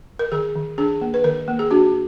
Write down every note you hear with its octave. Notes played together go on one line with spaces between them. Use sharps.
A#4
D#3 G#4
D#3
D4 G#4
A#3
B4
D#3 A#4
A#3
G#4
D4 F#4